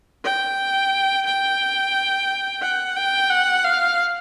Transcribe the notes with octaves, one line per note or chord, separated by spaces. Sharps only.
G5
G5
F#5
G5
F#5
F5